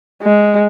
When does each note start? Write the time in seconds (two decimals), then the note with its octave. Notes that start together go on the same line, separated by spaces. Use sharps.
0.23 G#3